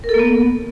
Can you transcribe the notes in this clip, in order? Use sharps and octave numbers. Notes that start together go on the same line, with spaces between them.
A#4
A4
A#3
B3